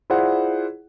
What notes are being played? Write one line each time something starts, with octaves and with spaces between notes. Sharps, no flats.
E4 F4 G#4 C5 D5 F#5